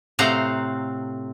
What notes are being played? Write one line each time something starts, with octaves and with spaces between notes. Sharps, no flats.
A2 C3 C4 F5 F#5 A#5